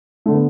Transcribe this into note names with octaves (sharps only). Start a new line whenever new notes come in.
D3 A3
B3